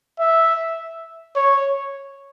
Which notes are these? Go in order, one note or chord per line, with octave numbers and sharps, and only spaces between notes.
E5
C#5